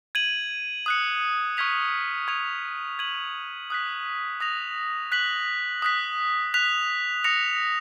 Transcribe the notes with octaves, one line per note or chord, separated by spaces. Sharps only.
G#6 D#7 F#7
D#6 F#6 C#7
C#6 F6 G#6 B6 F7
C#6 G#6 C#7 F7
G#6 D#7 F#7
D#6 F#6 B6
D#6 A#6 F7
F#6 B6 F#7
D#6 F#6 B6
F#6 B6 F7
D#6 A#6 C#7 F7